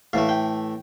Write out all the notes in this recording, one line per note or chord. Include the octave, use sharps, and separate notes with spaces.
A2 E3 A3 F5
G5